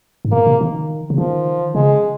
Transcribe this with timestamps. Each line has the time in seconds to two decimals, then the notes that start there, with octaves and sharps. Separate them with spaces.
0.25 G#2
0.31 A#2 A#3
0.47 C3
0.61 D#3
1.10 C#3
1.18 D#3 F3
1.75 C#3 G#3